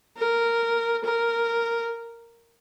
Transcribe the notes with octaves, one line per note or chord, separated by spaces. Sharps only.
A#4
A#4